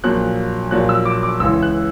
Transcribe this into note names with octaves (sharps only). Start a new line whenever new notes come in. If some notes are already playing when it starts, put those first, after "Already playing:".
A#1 A#2 F#3 F#6
A#1 A#2 F#3 F#6
E6
D6
D6
C#2 C#3 E3 E6
F#6